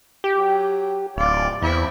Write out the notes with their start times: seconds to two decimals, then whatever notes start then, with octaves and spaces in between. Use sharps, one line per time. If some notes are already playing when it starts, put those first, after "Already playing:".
0.24 G4
0.37 F#3
1.17 D1 F4 D5
1.62 E2 C4 E4